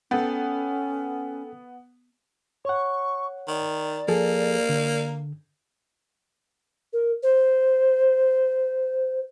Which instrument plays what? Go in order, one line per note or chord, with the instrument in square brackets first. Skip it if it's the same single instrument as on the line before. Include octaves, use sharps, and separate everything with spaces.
[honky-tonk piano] B3 [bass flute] C#4 [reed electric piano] A4 G5
[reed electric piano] C#5 F#5 [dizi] C#6
[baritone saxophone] D#3 [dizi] D5
[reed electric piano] F3 G#4 A4 [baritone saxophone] A#3
[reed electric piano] D3
[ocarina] A#4
C5